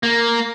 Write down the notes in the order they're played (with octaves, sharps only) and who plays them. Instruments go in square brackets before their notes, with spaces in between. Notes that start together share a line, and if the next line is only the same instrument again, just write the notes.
[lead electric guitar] A#3